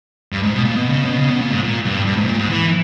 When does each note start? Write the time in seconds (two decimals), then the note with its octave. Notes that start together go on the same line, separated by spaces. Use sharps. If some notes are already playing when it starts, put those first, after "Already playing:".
0.32 G2
0.43 G#2
0.54 B2
0.65 A#2
0.76 B2
0.90 C#3
1.05 B2
1.19 C#3
1.30 B2
1.41 A#2
1.52 G#2
1.63 A#2
1.85 G2
2.06 G2
2.17 G#2
2.23 B2
2.28 A#2
2.39 G#2
2.49 E3